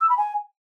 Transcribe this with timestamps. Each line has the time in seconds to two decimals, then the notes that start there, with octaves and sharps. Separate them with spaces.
0.01 E6
0.09 B5
0.18 G#5